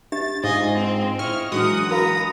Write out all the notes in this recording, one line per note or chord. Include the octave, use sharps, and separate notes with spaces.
D4 G4 E5 A6
G#2 F4 D#5 G#5
C4
E4 D#5 C#6 F6
E3 F#3 G#3 D4 F#4 A#4 F#5 D#6
F#4 A#4 F5 A#5 B5